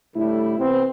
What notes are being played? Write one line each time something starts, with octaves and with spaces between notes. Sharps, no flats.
A2 D3 G3 E4
C3 E3 B3 C4